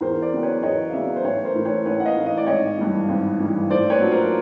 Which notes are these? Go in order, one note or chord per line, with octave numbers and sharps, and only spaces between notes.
E2 A#4 C5
C5 D5
C#3 F#3 B3
B4 C#5
E2 C#5 D#5
F5
C#3 F#3 B3 D5 E5
C5
A1 B4 C#5
A#4 C5
A2 E3
B4 C#5
A1 B4 C#5
F#5
D#5 F5
A2 E3
D#5
D5
G#1 C#5 D#5
G2 E3
G#1
G2 E3
A2 C5 D5
B4 C#5
F#3 A#3 D4 F4
A#4 C5